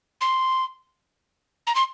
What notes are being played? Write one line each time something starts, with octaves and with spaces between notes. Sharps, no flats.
C6
A#5
C6